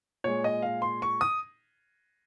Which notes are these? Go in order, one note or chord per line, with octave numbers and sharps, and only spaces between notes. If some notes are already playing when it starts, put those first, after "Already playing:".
A#2 G#3 C#5
D#5
F5
C6
C#6
D#6